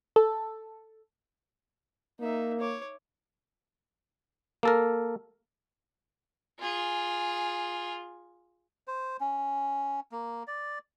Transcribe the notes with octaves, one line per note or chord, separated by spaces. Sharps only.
A4
A#3 D#4 E5
C#5 D6
A#3 A4 A#4
F4 G#4
C5
C#4
A#3
D5